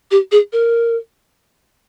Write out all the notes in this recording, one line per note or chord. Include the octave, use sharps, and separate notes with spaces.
G4
G#4
A#4